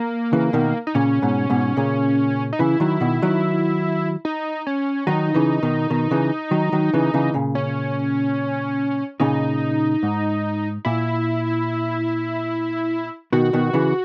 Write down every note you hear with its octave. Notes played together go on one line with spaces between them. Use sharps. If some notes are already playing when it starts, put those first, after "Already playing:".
Already playing: A#3
C#3 E3
B2 D#3
D#4
A#2 C#3 C#4
G#2 B2
G#2 B2
A#2 C#3
D#4
C#3 E3 E4
D#3 F#3
B2 D#3
D#3 F#3
D#4
C#4
D#3 F#3 D#4
C#3 E3
B2 D#3
B2 D#3
C#3 E3
D#3 F#3
D#3 F#3
C#3 E3
C#3 E3
A#2 C#3
C#4
A#2 C#3 D#4
G#2
A#2 E4
B2 D#3 F#4
B2 D#3
C#3 E3